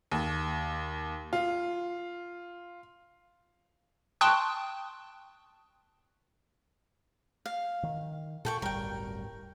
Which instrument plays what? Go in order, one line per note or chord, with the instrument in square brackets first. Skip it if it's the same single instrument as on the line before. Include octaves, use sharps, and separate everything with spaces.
[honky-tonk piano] D#2
F4
[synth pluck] G5 A5 C6 C#6 D#6 F#6
[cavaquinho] F5
[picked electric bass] D#3
[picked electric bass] A#2 [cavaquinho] A4 G5 C#6
[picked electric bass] D1 G1 G3 [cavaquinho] A#4 G5